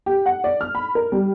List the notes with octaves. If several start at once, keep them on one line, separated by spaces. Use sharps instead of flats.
G4
F#5
D5
F6
B5
A#4
G3